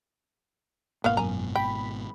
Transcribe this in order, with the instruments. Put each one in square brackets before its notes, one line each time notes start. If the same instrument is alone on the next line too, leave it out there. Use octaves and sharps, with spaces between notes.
[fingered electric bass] G#1 G#2 B2 [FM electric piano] A#3 [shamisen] B3 C#5 F5
[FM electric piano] F#2 [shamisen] G#5 A#5
[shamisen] G5 [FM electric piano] B5